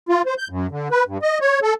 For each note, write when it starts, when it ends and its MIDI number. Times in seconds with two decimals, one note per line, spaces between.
0.09 0.22 65
0.26 0.34 72
0.38 0.48 91
0.50 0.67 42
0.71 0.88 50
0.91 1.04 71
1.08 1.18 43
1.22 1.38 75
1.41 1.59 73
1.63 1.74 69